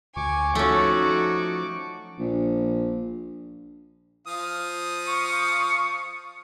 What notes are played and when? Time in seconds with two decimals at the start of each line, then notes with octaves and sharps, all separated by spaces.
0.16 D2 G#5 C#6 D6
0.55 F3 A3 C#4 D#4 F#4 A4
2.19 A#1
4.27 F3 F5 D#6
5.07 C#6